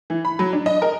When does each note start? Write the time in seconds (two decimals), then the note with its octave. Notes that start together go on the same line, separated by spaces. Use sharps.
0.10 E3
0.25 B5
0.39 F#3
0.53 D4
0.66 D#5
0.82 A#4